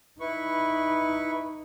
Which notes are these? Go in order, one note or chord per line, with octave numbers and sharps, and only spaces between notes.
D#4 E4 B4 C#6